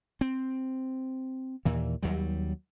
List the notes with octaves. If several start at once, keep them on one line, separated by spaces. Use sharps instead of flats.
C4
D#2 A#2 E3
D#2 F#3 G3